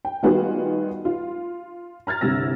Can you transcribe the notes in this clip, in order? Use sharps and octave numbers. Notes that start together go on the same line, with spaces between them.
G5
D#3 G3 B3 F4 F#4 G#4
F4
A#5 F6 G#6 A6
G1 C2 C3 E6 A#6